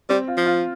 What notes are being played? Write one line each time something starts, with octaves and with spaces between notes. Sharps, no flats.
G3 C4
F4
F3
F4